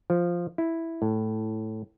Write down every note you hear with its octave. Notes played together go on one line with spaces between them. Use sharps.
F3
E4
A2